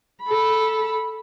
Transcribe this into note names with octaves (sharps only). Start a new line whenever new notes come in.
A4 B5